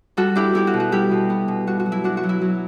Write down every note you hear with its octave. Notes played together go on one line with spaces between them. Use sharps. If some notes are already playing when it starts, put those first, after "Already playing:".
G3 F#4 A4
D4 E4 G4
B3 E4 G4
F#4
B2
F#4
G3 E4 G4
B2
B3
B2
G2 F#4
F#4
F#3
E4
D4 F#4
F#4
F#3
E4
F#3